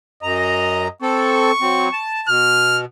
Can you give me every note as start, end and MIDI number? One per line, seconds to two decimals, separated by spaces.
0.23 0.88 42
0.23 0.92 75
0.23 0.88 82
1.02 1.51 60
1.02 1.51 69
1.02 2.05 85
1.61 1.89 54
1.61 1.89 60
1.93 2.28 81
2.28 2.85 47
2.28 2.80 89